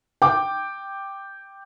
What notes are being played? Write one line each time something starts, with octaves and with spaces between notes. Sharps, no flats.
G5 D6